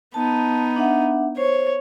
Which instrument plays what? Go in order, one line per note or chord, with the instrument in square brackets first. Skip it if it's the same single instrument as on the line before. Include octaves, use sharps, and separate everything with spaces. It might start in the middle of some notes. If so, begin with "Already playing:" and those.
[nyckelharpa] B3 D#4 [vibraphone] A5
[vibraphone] D4 E5 F#5
[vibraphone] C5 [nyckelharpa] C#5